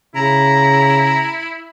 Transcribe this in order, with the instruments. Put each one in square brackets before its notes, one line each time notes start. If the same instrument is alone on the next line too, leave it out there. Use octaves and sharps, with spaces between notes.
[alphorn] C#3 [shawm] E4 [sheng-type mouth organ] A#5